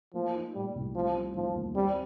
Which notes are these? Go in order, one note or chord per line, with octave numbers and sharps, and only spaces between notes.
F3 A#3
D#4
A#2 G3
C2
F3 G3
C4
D#3 F3
D#2
G3 C4